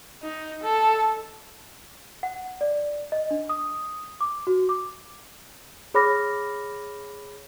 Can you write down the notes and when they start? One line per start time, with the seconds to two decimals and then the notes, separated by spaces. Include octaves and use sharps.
0.23 D#4
0.63 A4
2.23 F#5
2.61 D5
3.12 D#5
3.31 D4
3.49 D#6
4.21 D6
4.47 F#4
4.69 D6
5.94 G#4 C#5 B5 D6 F6 A#6